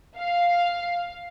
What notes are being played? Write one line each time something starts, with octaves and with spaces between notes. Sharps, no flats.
F5